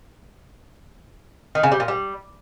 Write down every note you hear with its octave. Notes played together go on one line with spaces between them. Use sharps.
D#3
C#3
G3
A#2
G3